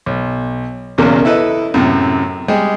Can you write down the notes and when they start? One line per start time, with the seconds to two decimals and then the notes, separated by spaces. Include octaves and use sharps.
0.06 B1
0.98 B1 E2 C#3 F#3 A#3
1.25 E4 A4 B4 D#5
1.74 F#2 A2 C3
2.48 G3 G#3